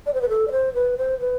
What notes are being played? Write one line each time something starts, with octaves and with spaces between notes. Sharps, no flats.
D5
C5
B4
A4
D5
C5
B4
C5
B4